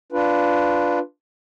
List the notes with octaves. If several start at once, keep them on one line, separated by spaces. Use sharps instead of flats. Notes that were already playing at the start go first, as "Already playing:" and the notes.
D4 F4 B4